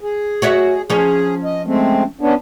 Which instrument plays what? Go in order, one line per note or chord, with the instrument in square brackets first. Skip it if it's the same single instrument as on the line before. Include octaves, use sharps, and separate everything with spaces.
[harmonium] G#4
[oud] F#4 C#5 E5
[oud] F3 C#4 [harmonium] G#4
[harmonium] D#5
G#3 A3 C4
B3 C#4 D4